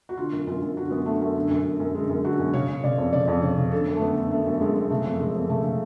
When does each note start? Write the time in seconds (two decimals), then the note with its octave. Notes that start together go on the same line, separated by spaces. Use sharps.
0.09 F#4
0.17 D3 F4
0.32 F#2
0.47 F#2 F4
0.62 F#2
0.77 D3 F#4
0.91 F#2 B3
1.06 D3 A3
1.20 F#2 A3
1.36 D3
1.50 F#2
1.65 F#2
1.80 F#2
1.95 D3 G#3
2.09 F#2
2.24 D3 F#4
2.39 F#2
2.53 C#3 C#5
2.68 C#3
2.84 C#3 D5
2.98 F2
3.13 C#3 D5
3.28 F2
3.42 C#3 C#5
3.57 C#3
3.72 D3 A4
3.87 F#2
3.97 A3
4.01 D3 B3
4.16 D3
4.31 F#2 A3
4.46 F#2
4.61 F#2 G#3
4.75 F#2
4.90 C#3 A3
5.05 F2
5.20 C#3 G#3
5.35 F2
5.49 C#3 A3
5.63 C#3